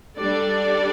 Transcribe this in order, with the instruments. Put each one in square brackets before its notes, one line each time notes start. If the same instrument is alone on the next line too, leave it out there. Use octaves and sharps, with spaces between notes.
[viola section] G3 D4 A4 D5